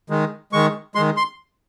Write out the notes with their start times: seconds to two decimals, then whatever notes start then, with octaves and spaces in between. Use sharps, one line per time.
0.10 D#3 G#3
0.52 D#3 G#3 C#6
0.95 D#3 G#3 C6
1.17 C6